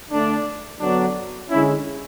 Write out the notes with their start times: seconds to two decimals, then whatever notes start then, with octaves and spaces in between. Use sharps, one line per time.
0.11 D3 A3 D4
0.80 D3 F#3 B3 D4
1.50 D3 G#3 C#4 E4